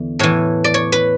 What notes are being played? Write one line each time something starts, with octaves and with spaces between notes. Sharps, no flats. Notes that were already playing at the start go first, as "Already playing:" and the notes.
Already playing: E2 D3
A2 E3 C#5
D5
C#5
B4